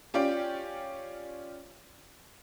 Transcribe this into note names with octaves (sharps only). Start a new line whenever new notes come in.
C#4 F4 G4 D5 G5